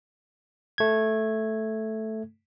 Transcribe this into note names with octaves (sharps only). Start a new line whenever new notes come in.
A3 G#6